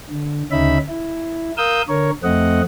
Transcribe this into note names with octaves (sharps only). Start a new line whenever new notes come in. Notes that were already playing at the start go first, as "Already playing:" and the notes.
D3
D2 C#3 C#4 D#4 E5 B5
E4
A#4 F5 D#6 E6 G6
D3 A#4 C#5
F2 A3 C4 D#5 F#5